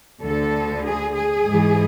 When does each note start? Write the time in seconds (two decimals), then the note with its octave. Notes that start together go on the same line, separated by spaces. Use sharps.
0.22 D2 D3 A4
0.85 G#4
1.16 G#4
1.47 G#2 E3